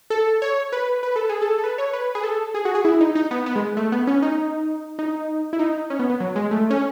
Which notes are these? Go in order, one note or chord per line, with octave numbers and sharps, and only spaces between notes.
A4
C#5
B4
B4
A4
G#4
A4
A4
B4
C#5
B4
G#4
A4
G#4
F#4
G#4
E4
D#4
D#4
B3
B3
G#3
A3
B3
C#4
D#4
D#4
E4
D#4
C#4
B3
B3
F#3
G#3
A3
C#4